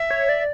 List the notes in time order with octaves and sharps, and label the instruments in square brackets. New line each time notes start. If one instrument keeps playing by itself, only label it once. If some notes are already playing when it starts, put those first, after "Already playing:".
Already playing: [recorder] E5
[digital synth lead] C#5
D5